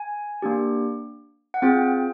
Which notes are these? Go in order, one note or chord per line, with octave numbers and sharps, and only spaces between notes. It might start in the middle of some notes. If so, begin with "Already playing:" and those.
Already playing: G#5
A#3 D4 G4
F#5
C4 F4 G#4 G5